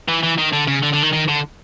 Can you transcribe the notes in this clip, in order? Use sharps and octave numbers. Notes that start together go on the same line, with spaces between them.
E3
E3
D#3
D3
C#3
D3
D3
D#3
D#3
D3